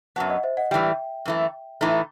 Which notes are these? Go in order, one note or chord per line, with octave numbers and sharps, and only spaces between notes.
F#2 F#3 B3 F#5 A5
D#5 F#5
C5 E5
D#5 F#5
A2 E3 G3 E5 G5
F#2 E3 A3
A2 E3 A3 D#4